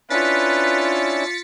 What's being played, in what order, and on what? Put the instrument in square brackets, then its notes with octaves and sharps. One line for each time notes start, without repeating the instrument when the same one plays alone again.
[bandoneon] C#4 D4 E4 [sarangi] F4 [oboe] B4 [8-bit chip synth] A6 B6 C#7